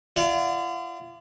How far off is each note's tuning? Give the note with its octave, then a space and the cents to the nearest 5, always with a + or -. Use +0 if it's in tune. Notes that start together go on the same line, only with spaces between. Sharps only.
F4 -40 D5 +15 F#5 -35